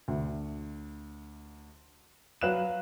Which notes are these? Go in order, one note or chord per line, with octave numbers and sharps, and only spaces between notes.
D2
F#3 B4 F5 F#6 E7